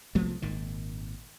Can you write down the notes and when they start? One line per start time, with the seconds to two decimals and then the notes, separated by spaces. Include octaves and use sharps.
0.15 C2 F3 A3 B3
0.42 G#1 A#2 D#3